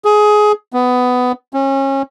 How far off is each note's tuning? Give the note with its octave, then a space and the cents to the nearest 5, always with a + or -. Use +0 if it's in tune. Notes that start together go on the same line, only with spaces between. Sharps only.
G#4 +15
B3 +15
C#4 -30